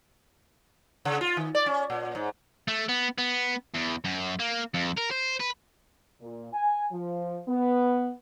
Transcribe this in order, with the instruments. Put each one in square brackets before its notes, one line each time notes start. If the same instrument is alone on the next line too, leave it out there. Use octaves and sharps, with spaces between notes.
[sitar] C#3
F4
D#3
D5
C#4
A#2
G#2
[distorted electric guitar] A3
B3
B3
E2
F#2
A#3
F2
A#4
C5
B4
[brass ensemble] A#2
G#5
F3
B3